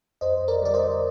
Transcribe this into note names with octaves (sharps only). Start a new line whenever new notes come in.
F2 C5 D#5
A#4 D5
D3 G3 D5
C5 D#5